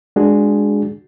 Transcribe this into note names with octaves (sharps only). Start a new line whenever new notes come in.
G#3 D4 F#4 G#4